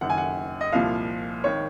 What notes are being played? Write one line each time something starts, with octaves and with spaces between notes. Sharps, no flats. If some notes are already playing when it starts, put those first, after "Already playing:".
F#1 F#2 D#3 F#5
G#5
F#5
D#5
C2 A#2 F3 F5
G#1 D#3 C#5